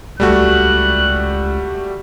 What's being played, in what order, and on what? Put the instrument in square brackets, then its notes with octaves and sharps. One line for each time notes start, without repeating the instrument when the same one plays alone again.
[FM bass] D#1 [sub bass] C#2 [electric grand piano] G3 A3 F#4 [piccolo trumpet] F#6